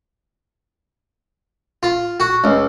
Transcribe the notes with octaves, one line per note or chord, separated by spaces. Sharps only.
F4
F#4
C#2